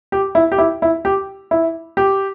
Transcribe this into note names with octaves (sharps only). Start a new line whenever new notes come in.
G4
E4
G4
E4
E4
G4
E4
G4